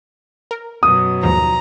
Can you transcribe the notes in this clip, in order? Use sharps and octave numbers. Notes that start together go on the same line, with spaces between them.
A#4
F#2 B2 F#3 D#6
D#2 G#2 F3 A#5